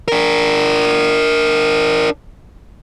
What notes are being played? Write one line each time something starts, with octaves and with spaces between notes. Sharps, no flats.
D4 A#4